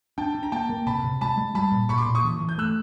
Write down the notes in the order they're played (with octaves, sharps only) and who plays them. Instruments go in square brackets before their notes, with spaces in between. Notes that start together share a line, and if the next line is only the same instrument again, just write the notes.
[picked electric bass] D4 [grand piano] G5 A5
[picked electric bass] D4
[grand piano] A#5
[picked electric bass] A#3 [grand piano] G5 A5
[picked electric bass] A#3
[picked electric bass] C3 [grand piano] A5 B5
[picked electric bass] C3
[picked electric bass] G#3 [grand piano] A5 B5
[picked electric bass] G#3
[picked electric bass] G3 [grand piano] A5 B5
[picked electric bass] A#2
[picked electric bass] A#2 [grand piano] B5 C#6
[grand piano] C6 D6
[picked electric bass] A#2
[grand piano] C#6 D#6
[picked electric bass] E3
E3
[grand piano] G6
[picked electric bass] A3 [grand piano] E6 F#6